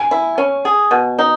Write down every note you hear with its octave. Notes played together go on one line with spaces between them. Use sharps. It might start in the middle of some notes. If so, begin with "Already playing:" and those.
Already playing: G#5
E4
C#4
G#4
B2
D#4